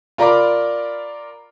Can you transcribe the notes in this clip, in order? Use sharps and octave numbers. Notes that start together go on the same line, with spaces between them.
F4 A#4 D5 A#5 B5 D6